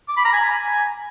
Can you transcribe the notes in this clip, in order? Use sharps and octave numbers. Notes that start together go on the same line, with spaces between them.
D6
B5
A#5
G#5